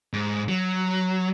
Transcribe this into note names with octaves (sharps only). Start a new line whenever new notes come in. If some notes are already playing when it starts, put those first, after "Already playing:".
G#2
F#3